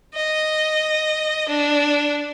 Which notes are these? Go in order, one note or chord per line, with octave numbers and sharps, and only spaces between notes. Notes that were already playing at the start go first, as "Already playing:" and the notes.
D#5
D4